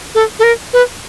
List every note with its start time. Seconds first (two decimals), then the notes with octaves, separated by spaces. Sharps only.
0.15 A4
0.39 A4
0.43 A#4
0.73 B4